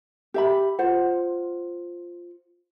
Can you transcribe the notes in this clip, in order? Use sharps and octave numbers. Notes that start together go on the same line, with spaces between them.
G4 E5 B5
F4 C5 F#5